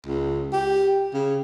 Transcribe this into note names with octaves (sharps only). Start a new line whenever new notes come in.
C#2
G4
C#3